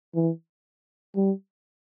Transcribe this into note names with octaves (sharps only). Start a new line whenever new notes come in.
E3
G3